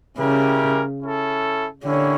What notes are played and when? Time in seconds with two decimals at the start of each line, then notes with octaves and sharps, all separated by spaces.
0.18 C#3 G3 C#4 E4 G4 A#4
1.01 C#4 E4 A4
1.84 D3 A#3 C#4 E4 G4 C#5